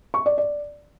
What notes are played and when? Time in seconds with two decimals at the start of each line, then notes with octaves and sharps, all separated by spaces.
0.14 C#6
0.26 D5
0.38 D5